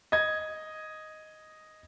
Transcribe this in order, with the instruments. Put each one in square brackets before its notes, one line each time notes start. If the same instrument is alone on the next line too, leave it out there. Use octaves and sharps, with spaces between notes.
[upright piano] D#5 G#6